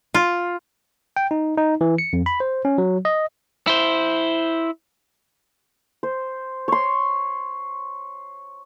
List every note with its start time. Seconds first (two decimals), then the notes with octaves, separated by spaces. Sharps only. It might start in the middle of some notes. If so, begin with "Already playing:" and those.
0.14 F4
1.16 G5
1.31 D#4
1.57 D#4
1.81 E3
1.98 C#7
2.13 F2
2.26 B5
2.40 C5
2.65 C#4
2.78 F#3
3.05 D#5
3.67 E4 C5
6.03 C5
6.68 C#5 C6